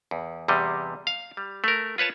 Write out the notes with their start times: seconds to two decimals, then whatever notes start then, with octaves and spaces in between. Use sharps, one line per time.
0.11 E2
0.48 E2 C3 G3 D#5
1.07 F5
1.37 G3
1.64 A3 A#4
1.98 F4 B4 C#5 A5